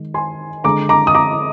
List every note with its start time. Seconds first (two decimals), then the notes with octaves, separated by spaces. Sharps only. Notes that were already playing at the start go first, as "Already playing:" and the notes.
Already playing: D#3 G#3
0.14 G#5 C6
0.64 D3 G#3 A#5 D6
0.89 A#5 D6
1.07 D#6
1.15 A#5 D6